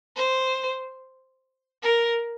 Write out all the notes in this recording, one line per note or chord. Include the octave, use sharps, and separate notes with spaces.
C5
A#4